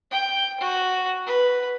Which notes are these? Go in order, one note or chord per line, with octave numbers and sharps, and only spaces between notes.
G5
F#4
B4